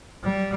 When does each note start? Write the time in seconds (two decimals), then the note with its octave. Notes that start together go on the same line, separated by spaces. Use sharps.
0.23 G3